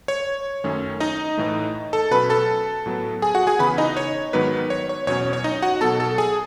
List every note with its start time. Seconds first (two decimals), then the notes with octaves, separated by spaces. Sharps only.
0.08 C#5
0.64 F#2 D#3 A3 C#4
1.00 D#4 D#5
1.37 A2 E3 A3
1.93 A4 A5
2.11 B2 F#3 C#4 B4 B5
2.30 A4 A5
2.86 A2 F#3 B3
3.22 G#4 G#5
3.35 F#4 F#5
3.47 G#4 G#5
3.59 C#3 E3 B3 B4 B5
3.78 D#4 D#5
3.97 C#5
4.33 G#2 D#3 F#3 B3 B4
4.70 C#5
4.89 C#5
5.07 E2 B2 F#3 C#4 C#5
5.33 C#5
5.44 D#4 D#5
5.62 F#4 F#5
5.81 B2 F#3 B3 A4 A5
6.00 A4 A5
6.18 G#4 G#5